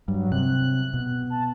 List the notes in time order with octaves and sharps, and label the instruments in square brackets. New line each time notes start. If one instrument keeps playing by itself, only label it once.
[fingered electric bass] G2 [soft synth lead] F#3
[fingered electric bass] C3 [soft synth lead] F#6
[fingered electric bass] B2
[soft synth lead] A5